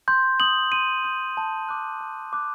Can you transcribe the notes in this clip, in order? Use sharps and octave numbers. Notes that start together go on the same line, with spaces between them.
C6 G6
D#6 G6 F#7
C6 D#7
D#6 G6
A5
D6 F#6
A5
D6 F#6